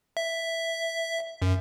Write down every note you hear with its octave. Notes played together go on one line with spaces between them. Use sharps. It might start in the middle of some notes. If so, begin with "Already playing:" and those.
E5
F#2